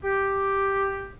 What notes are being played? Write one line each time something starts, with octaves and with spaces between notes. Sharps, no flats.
G4